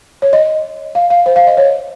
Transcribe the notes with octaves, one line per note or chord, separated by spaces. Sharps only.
C#5
D#5
F5
F5
C5
F5
D#5
C#5